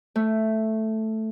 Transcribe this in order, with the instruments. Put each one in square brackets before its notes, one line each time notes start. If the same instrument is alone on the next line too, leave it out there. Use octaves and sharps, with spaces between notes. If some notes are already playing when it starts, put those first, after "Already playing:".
[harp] A3